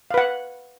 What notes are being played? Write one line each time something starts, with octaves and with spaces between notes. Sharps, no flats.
B4 F5 F#5